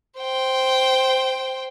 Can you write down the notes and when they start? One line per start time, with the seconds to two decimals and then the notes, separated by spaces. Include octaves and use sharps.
0.19 C5 G5